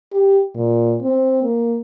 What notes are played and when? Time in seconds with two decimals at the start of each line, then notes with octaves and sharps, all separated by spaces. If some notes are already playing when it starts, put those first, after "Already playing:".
0.13 G4
0.56 A#2
1.02 C4
1.43 A#3